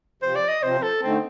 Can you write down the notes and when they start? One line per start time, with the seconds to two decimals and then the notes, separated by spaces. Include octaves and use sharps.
0.22 C3 F3 C4 C5
0.36 D5
0.49 D#5
0.63 C3 F3 C4 C5
0.83 A4
1.03 D3 A3 C4 D#4